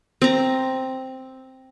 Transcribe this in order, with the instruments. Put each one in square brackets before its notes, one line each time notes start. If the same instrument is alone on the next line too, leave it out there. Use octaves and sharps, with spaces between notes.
[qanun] C4 A#5